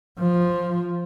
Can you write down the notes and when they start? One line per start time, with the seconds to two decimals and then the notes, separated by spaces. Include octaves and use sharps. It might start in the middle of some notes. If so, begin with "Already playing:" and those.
0.19 F3